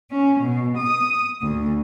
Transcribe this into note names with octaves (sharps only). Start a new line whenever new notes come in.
C#4
B2
D#6
D2